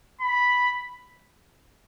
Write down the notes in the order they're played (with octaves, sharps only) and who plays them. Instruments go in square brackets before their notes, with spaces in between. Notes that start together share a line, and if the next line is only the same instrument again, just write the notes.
[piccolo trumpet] B5